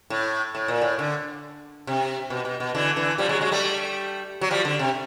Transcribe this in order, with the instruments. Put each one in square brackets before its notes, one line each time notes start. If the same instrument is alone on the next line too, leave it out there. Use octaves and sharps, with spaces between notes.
[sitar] A2
A2
A#2
A2
D3
C3
B2
B2
B2
D3 E3
D3 E3
F3 G3
F#3 G#3
F#3 G#3
G3 A3
F#3
F3 G3
D3
C3